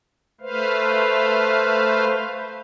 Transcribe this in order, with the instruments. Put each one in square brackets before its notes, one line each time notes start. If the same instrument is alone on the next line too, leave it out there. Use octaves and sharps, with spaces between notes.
[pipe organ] A3 B4 C5 F5